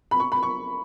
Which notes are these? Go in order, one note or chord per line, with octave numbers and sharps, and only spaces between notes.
B5
C#6
B5
C#6